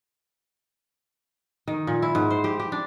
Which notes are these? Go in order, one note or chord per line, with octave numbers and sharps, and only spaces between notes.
D#3
A#2
E4
G#2
C5
G4
G4
D4